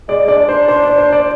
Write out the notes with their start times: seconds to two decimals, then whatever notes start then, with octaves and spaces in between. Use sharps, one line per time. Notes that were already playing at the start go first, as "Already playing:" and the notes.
0.08 G#3 D5
0.28 D4 D5
0.49 D4 C5
0.68 D4 C5
0.83 D5
0.98 C5
1.13 D5